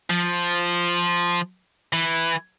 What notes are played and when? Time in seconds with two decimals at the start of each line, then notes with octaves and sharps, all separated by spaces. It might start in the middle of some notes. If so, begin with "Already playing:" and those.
0.10 F3
1.93 E3